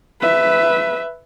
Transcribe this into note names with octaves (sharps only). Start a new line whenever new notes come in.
B4 E5